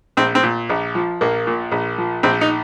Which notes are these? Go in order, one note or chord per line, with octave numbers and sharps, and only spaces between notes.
A#1 C4
C4
A#2
A#1
F3
A#1 A#3
A#2
A#1
F3
A#1 C4
D#4